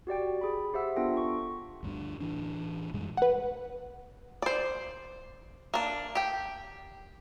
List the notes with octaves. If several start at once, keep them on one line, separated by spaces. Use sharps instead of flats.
F#4 G4 D5 G5
G#4 B5
G4 C5 E5 F#5 E6
B3 D4 F4 A4 G5 A#6
C#6
D2 G2 D3
A1 E3 D4
F#2 A#2 G3 G#3
B4 F#5
C5 D5
A#3 D4
G4 G5